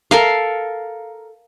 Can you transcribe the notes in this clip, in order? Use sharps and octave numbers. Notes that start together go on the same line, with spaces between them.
A4 A#4 F5